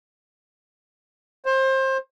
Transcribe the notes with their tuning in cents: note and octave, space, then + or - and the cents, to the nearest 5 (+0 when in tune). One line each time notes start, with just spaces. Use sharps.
C5 +25